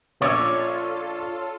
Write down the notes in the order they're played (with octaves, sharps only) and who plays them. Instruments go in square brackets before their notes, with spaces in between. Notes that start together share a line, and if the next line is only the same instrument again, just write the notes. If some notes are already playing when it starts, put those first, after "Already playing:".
[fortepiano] A#1 C#4 E6 [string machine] F4 A4 [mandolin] C#5 [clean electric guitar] D5